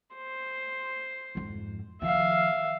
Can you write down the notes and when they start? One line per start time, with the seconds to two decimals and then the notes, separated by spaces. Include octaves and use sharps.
0.15 C5
1.35 F2 G#2
2.02 D#3 F3 E5 F5